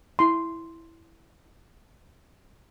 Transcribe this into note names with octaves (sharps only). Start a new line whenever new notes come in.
E4 C6